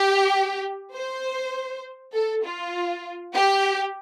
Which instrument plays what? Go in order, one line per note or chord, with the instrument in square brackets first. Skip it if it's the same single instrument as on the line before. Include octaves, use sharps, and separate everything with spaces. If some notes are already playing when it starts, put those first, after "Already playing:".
Already playing: [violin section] G4
C5
A4
F4
G4